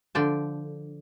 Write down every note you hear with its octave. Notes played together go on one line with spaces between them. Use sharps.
D3 F3 D5 G5 A5